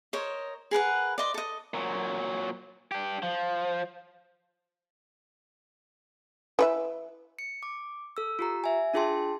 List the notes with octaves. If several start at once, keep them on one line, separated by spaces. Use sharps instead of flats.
A#4 C5 C#5 D#5
G#4 A#4 B4 F#5
D5 D#5 C6
A4 D#5
A#2 F#3
D4 G4
F3
E3 B4 E5
C#7
D6
A4 E6
F4 G4 A#5
E5 G#5
D4 F4 G#4 G5 A5 C6